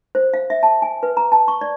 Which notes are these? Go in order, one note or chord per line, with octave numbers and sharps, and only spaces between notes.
C5
F5
E5
A5
G#5
B4
A#5
A5
C#6
D5